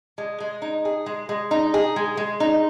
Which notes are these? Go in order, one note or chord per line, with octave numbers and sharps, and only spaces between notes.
G#3
G#3
D#4
G#4
G#3
G#3
D#4
G#4
G#3
G#3
D#4